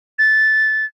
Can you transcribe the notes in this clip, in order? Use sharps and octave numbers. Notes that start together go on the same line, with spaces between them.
A6